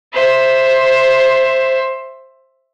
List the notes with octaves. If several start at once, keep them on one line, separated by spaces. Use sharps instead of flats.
C5 E5